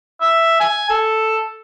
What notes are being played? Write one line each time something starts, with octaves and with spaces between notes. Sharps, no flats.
E5
G#5
A4